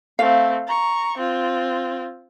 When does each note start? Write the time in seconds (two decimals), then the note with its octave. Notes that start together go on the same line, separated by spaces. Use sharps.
0.19 A3 C4 F5
0.67 A#5 C#6
1.17 C4 F4